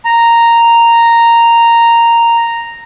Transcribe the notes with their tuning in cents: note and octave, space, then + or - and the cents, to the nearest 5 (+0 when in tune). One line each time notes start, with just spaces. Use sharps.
A#5 -5